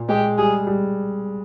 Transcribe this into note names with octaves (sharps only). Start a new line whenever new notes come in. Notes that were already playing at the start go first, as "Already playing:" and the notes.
Already playing: A#2
G#3 G4
G3 G#4
G3